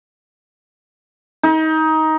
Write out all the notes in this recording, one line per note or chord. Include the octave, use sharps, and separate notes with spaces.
D#4